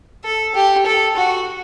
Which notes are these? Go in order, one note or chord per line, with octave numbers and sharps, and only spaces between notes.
A4
G4
A4
F#4